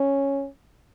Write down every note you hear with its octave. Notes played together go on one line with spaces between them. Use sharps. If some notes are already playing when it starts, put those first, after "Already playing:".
Already playing: C#4